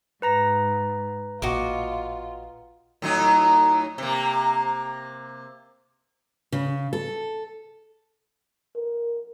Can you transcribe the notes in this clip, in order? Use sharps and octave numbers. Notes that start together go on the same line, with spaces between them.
G#2 B4 A#5 A#6
A1 A#2 F4 F#4 D#5 D6
A2 F#3 D#4
C3 A#3
C#3
A4
A#4